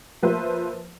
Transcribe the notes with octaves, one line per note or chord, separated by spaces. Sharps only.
F3 A#3 B4 C5 E5